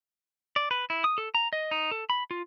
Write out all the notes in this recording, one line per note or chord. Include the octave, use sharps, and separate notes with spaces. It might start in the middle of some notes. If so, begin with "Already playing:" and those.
D5
B4
E4
D#6
A4
A#5
D#5
D#4
A4
B5
F4